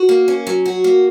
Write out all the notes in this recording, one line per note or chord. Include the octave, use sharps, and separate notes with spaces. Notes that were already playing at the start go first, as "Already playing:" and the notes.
Already playing: F#4
A#3
C#4
F#3
F#4
A#3